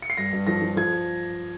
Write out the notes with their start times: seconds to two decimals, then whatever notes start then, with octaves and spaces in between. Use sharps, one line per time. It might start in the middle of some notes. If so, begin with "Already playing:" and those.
0.02 C#7
0.10 C7
0.17 G2 A#6
0.33 G2
0.47 F3 A#6
0.62 F3
0.76 F3 G#6